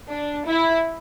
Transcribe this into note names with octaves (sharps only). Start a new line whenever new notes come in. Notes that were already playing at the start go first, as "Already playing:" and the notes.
D4
E4